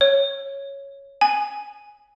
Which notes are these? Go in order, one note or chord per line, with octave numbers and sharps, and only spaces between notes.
C#5
G#5